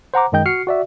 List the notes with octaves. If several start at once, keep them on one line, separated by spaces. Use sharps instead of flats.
C5 F#5 A#5 D6
F#2 D#3 G#3 D#5 G5 G6
F#4 F6 C7 C#7
F#4 D5 E5